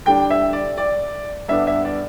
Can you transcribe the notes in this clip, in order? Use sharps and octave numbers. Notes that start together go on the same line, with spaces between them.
D3 G3 D4 G5
E5
D5
D5
G2 D3 B3 D4 E5
E5
D5